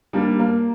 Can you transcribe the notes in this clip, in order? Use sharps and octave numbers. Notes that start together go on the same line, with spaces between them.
G3 A#3 D4
A#3